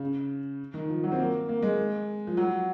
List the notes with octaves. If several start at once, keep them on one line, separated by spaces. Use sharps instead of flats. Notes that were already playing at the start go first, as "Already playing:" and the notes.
Already playing: C#3
D#3
F3
F#3
C4
A#3
A#3
G#3
F3
F#3